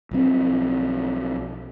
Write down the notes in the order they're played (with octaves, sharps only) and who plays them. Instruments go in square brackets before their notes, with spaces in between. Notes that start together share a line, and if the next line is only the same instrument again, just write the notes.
[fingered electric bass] B1 F3 C4